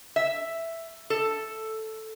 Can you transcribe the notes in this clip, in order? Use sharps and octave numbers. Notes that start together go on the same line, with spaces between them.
E5
A4